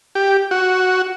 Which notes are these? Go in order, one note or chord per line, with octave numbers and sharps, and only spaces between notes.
G4
F#4